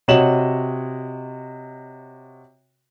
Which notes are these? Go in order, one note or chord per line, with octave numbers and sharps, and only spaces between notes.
C3 F#4 C#5 D#5 E7 F#7